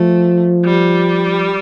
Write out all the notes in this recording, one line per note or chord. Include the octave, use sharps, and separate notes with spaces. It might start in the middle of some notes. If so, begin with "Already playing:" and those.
Already playing: F3 A3
G3